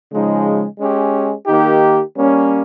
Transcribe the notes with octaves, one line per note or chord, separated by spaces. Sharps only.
C#3 F3 G#3 D#4
G#3 C#4 G4
D#3 A#3 D#4 G4
G3 A#3 C#4